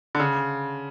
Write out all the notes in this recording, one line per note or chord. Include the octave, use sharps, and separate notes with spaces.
D3
C#3